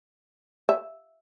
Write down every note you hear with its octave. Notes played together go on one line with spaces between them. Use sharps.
E5